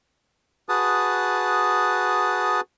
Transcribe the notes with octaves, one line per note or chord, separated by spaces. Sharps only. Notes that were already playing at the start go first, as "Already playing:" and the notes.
F#4 G#4 B4 A5 D#6